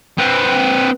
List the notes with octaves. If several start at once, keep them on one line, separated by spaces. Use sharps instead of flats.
C4 B4